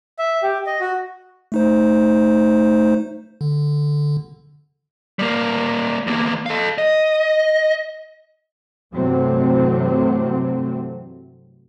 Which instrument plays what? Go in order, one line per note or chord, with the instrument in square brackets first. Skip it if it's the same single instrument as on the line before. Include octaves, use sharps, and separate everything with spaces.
[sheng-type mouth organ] E5
G4
D#5
F#4
[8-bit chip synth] A3 D#4 C5
D3
[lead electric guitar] G3 A#3
E2 A#3
A4 F5
D#5
[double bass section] G2 C3 E3 F#3 A3 C4